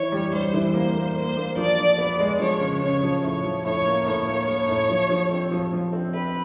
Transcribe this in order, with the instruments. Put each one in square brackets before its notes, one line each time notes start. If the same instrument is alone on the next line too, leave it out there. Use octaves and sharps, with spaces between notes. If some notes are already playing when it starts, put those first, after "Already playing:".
Already playing: [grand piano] E3 [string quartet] C#5
[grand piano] G3
[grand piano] G3 [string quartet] C5
[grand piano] E3
[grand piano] A#3 [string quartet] C5
[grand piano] A#3
[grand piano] A#3 [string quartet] C5
[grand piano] A#3
[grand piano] F3 [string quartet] D5
[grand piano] F3
[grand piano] B3 [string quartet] D5
[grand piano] G#3
[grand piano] F3 [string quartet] C#5
[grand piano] C#3
[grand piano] C#3 [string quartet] C#5
[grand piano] F3
[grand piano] A2 [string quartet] C#5
[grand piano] F3
[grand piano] A2 [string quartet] C#5
[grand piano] A#3
[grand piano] A2 [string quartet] C#5
[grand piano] A#3
A#3
A2
F3
F3
C4
F3
F3
C4
[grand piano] C4 [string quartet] B4